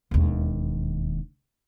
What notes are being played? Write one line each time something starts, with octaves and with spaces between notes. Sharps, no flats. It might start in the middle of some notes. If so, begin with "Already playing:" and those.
E1 D#2